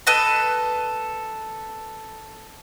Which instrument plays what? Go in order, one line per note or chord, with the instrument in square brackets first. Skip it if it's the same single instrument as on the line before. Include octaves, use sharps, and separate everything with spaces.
[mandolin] A4 B4 D#5